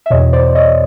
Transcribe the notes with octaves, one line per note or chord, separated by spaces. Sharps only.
E5
E2 B2 C#5 D#5
C5 D5
C#5 D#5